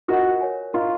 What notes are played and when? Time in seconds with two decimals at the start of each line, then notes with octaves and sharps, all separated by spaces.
0.08 F4 F#4 A#4 D#5 F#5
0.41 A#4 C#5 G#5
0.73 F4 A#4 D#5 A#5 C#6